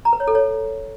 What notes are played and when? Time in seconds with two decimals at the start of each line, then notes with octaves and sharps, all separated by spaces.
0.05 A#5
0.13 B4
0.20 C#5
0.28 A4
0.35 C#5